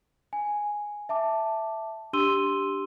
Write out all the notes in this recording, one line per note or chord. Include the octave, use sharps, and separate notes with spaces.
G#5
E5 A5 D6
D4 G4 C6 E6 D#7 G7